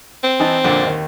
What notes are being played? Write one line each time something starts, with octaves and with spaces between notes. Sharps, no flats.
C4
E3 D#4 A5
F2 A#2 D3
D#2 D#3